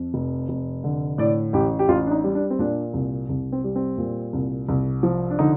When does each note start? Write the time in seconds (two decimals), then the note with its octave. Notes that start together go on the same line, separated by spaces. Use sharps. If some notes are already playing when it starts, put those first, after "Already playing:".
Already playing: F2
0.14 F1
0.49 F1
0.84 D3
1.18 A2 D5
1.53 A1 G4
1.79 G4
1.88 A1 F4
2.07 D4
2.11 D#4
2.24 G3
2.35 D4
2.50 C4
2.59 A#2 D4
2.94 C2
3.29 C2
3.52 C4
3.64 G3
3.76 C4
3.98 A#2
4.33 C2
4.69 C2
5.03 F3
5.30 D4
5.39 D3 D#4